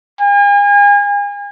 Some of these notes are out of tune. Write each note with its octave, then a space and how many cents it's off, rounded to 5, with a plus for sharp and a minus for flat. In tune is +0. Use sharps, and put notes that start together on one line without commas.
G#5 -40